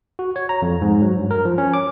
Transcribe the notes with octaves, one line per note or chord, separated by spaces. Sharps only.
F#4
C#5
A#5
F2
G#2
F#3
G2
A#4
F3
C#4
D6